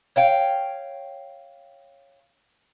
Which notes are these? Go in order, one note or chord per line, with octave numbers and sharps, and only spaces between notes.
C#5 F5 G5